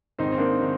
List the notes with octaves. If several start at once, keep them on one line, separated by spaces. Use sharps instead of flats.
G#2 D#3 C4 D#4
C4
A#3 D4
D#3